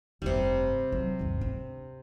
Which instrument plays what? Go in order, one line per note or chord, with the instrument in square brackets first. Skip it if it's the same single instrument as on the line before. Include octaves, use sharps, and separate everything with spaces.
[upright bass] F1 G2 [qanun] C3 G3
[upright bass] F#3
G#1 D#2
D4